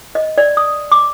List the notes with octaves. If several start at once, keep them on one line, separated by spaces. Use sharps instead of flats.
D#5
D5
D#6
D6